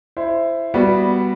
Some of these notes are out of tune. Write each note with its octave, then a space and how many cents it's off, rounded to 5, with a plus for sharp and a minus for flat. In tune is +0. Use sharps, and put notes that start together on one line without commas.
E4 +15 C5 +0
G3 +0 B3 +0 F#4 +0